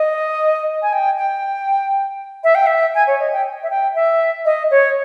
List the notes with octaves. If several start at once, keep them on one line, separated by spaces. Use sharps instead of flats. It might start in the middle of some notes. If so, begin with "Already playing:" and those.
Already playing: D#5
G#5
G5
G5
E5
G5
E5
G#5
C#5
D#5
G5
E5
G5
E5
D#5
C#5